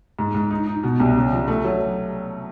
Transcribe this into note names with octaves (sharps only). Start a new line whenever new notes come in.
G#2
G#2
D#4
D#4
B2
C2
C#3
F3
A3
F#3